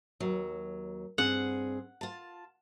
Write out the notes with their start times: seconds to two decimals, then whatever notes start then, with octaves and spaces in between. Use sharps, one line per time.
0.20 D#2 F#3
1.18 G2 C4 G#4 F#5
2.01 F4 A5